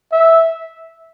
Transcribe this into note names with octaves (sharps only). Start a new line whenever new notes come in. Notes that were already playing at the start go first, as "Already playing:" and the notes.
E5